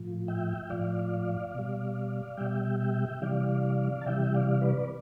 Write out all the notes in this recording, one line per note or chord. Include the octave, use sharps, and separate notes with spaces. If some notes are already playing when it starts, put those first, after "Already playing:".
Already playing: A2 F3
E5 G5
A2 F3 D5 F5
B2 G3
B2 G3 E5 G5
E5 G5
C3 E3 G3 D5 F5
A5
C3 E3 G3 E5 G5
D5 F5
B4 D5